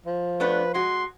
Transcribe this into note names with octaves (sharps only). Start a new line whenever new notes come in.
F3
A3 B3 D4 B4
G#3 F#4 C6